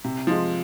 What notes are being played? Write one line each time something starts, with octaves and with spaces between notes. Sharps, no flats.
C3
F3 G#3